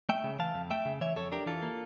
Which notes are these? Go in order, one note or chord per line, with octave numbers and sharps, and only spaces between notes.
A3 E5 G5
C#3
E3 F5 A5
F2
A3 E5 G5
C#3
E3 C#5 E5
F2 A4 C#5
D4 G4 A#4
E3 F4 A4
A#3